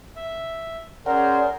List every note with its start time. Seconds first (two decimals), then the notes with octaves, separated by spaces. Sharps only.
0.16 E5
1.06 C#4 G#4 A#4 C5 D5 F#5